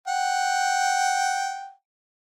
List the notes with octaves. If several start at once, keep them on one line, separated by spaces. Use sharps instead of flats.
F#5 G5